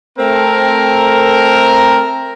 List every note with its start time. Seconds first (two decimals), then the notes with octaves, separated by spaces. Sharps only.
0.18 A3 C4 A#4